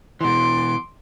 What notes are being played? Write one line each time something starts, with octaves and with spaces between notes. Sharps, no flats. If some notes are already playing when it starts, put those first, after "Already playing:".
B2 E3 C6 D6